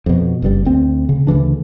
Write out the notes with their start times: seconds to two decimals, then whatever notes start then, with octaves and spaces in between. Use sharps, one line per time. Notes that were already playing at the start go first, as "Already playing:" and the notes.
0.06 F2 B2
0.42 F#1 G2 G3
0.65 D2 C4
1.09 C#3
1.27 D2 C#3 E3 D4